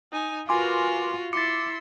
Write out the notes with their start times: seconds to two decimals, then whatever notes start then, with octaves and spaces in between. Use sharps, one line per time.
0.12 D#4 G#5
0.49 F4 F#4 A#4 B4 G#5 C6 D6
1.33 E4 C6 D6 E6 A6 C#7